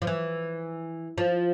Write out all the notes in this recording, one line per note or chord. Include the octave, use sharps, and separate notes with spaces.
F3
E3
F3